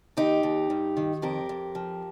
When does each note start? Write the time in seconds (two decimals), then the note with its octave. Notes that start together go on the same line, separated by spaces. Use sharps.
0.17 D#2 D#4 G4
0.43 D#2
0.70 G2
0.97 D#3
1.22 F2 G4 A#4
1.49 F2
1.75 F3